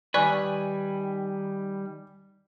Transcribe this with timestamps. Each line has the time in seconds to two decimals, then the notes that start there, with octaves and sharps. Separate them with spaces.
0.14 D#3 G3 B4 D5 G#5 C#6 F#6